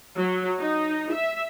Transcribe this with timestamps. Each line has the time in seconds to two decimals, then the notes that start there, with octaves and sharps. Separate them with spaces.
0.18 F#3
0.58 D#4
1.11 E5